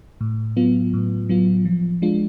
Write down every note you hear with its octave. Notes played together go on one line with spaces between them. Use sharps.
A2
F#3 B3 F4
A2
F#3 B3 F4
F3
G#3 D4 F4